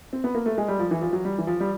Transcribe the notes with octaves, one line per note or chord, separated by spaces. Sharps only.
C4
B3
A#3
A3
G#3
G3
F3
E3
F3
F#3
G3
E3
F3
G3